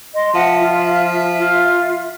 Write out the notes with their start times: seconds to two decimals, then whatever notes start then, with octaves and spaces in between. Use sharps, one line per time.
0.14 D#5 C6
0.35 F3 E5 F#5
0.60 F4
1.38 F4